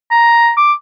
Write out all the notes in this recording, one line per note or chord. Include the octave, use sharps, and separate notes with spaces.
A#5
D6